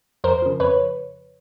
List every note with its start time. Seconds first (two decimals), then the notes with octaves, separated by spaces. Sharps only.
0.24 F2 A#4 C5
0.42 C#3 F3
0.60 F2 B4 C#5